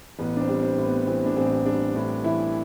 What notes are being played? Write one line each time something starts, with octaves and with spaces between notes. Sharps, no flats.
A1 B3
D4
C4
G3
C4
A2
B3
E3 C4
D4
A1 C4
G3 D4
A2 D4
E3 E4